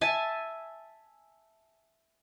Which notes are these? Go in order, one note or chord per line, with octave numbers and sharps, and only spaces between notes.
E5 G#5 A5